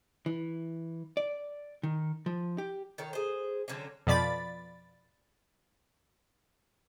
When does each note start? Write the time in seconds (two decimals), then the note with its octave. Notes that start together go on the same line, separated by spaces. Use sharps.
0.26 E3
1.17 D5
1.83 D#3
2.26 F3
2.58 G4
2.98 D#3 A4 C#5
3.13 G#4 C5
3.68 D3 F#3 C4 C#4
4.07 F2 B2 F3 D5 B5 A6